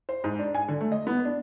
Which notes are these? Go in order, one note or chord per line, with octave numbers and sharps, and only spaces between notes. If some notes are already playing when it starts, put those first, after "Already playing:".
C5
G#2
D4
G#5
D3
A3
D#5
B3
D4